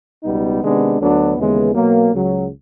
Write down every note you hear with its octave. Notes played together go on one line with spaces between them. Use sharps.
C#2 B2 G3 B3 D#4
C3 D#3 G#3 B3 D4
D2 D3 F#3 B3 D4
D#2 C#3 E3 G#3 B3
B2 F#3 A#3
C#2 C#3 F#3